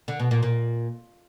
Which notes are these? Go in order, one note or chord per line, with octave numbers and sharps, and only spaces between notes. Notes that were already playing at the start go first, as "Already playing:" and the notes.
D3
B2
A#2
A#2